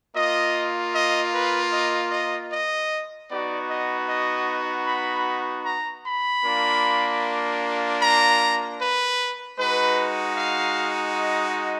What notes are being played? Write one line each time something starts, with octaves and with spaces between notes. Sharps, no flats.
A#3 F4 D#5
D#5
B4
D#5
D#5
D#5
B3 D#4 F#4 D5
D#5
D#5
B5
A#5
B5
A#3 D4 F4
A#5
B4
G#3 D#4 F#4 B4
F5
D#5